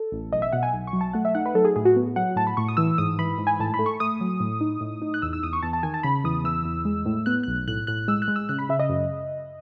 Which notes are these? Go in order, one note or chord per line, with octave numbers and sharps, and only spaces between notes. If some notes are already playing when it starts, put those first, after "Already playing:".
Already playing: A4
A1
B1 D#5
E5
B2 F#5
G#5
B1
C#6
F#3
A5
A3 F#5
E5
D#4 F#5
B4
F#3 A4
G#4
A2 G#4
F#4
B3
F#3 F#5
A2 A5
B5
A2 C#6
D#6
E3 E6
G#2 D#6
E3 B5
G#2
G#5
A2 A5
B5
A3
C#6
A3 D#6
F#3
A2
D#4
A2
D#4
F#6
E2 E6
E6
E2 D#6
C#6
E2 A5
A5
D#3 G#5
A5
C#3 B5
E2 D#6
E3 E6
E2
G#3
A2
B3 F#6
B1 F#6
A2 F#6
A2 F#6
G#3 E6
F#6
G#3
E6
C#3 F#6
B5
C#3 E5
D#5
F#2